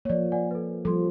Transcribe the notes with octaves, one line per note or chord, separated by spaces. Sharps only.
F3 A#3 C#5 D5
D5 F#5 G#5
A4 B4
F3 G3 A4 C6